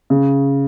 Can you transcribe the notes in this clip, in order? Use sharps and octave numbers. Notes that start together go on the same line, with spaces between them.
C#3